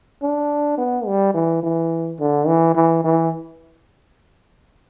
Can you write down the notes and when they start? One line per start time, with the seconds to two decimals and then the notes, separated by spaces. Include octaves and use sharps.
0.22 D4
0.78 B3
1.06 G3
1.34 E3
1.63 E3
2.20 D3
2.47 E3
2.75 E3
3.04 E3